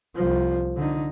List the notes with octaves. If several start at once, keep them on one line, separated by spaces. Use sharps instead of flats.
C2 F3
D3 D#4